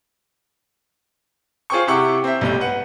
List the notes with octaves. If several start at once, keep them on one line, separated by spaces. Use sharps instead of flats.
F4 G#4 C5 G5 C#6
C3 E4 G4 F#5 C#6 D6
C4 E5
B1 A2 G3 G6
B4 F#5